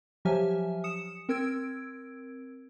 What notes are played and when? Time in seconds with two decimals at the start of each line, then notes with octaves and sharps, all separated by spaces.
0.25 F3 F#3 G4 E5 G#5 F6
0.84 D#6 C#7 E7
1.29 C4 A#4 E6 G#6 D7